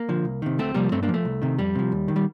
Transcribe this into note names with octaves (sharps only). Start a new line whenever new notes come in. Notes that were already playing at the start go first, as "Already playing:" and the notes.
Already playing: A#3
D3 F3
C2
C3 D#3
D2 A3 C4
C3 F3 G3 A#3
G2 A3 C4
A#3 D4
F3
A3
C2
C3 D#3
F2 G3
C3 F3
D#2
D#3
G3